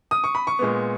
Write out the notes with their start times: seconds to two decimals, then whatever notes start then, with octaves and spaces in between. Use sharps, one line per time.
0.11 D#6
0.24 C#6
0.35 B5
0.47 C#6
0.59 A#2 G#3 B3